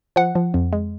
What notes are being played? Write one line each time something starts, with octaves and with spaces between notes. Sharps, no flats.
F3 F#5
F3
F2
G#3